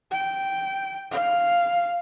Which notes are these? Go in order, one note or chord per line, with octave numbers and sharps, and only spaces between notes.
G5
F5